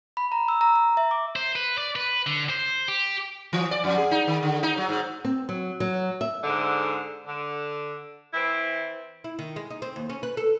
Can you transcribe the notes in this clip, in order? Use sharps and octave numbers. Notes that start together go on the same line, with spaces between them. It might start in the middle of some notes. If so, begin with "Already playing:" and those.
B5
A#5
E6
A#5
A#5
E5
D6
C5
B4
D5
B4
D3
C5
G4
E3
D5
F2
G#4
D#4
D#3
D3
D#4
F#3
G#2
C4
F#3
F#3
E5
G#2 D3
D3
E3 C4 E4
E4
D#3
G#3
D#4
C4
D#2
C#4
B4
A4